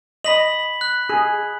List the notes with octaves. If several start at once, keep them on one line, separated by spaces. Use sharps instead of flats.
D#5 B5 B6 F#7
F#6
G#4